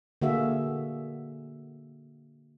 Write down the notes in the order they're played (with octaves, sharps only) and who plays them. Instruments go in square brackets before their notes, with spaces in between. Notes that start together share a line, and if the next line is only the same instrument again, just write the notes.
[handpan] D3 A#3 F#4 G#4 E5 F5